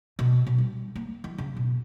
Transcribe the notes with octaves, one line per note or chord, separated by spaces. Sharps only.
B2
B2
G3
A#3
E3
C#3
B2